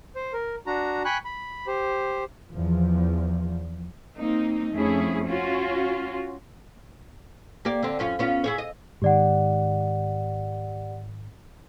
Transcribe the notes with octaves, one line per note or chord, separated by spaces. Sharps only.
C5
A#4
D4 F#4 A#5
G5 G#5 B5 C#6 F#6
B5
G4 C5
E2 F3
A#3 C4 D#4
F2 A3 C#4 E4 G#4
C#4 F4 F#4
A#3 G4 D5
D3 C4
F#2 C#4 F4
B3 C#4 F4
E4 G#4 C#5
D#5
G#2 D#3 G4 D5 F#5